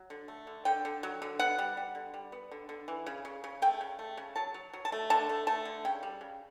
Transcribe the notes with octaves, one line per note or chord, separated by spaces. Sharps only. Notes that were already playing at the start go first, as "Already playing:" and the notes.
Already playing: F#3
D3
A3
D3
D3 G5
D3
F#3
D3
B3 F#5
G3
G3
D3
G3
B3
D3
D3
E3
C#3
C#3
C#3
A3 G5
C#3
A3
C#3
F#3 A5
F#3
F#3
A5
A3
D3 A5
A3
A3 A5
D3
C#3 G5
G3
C#3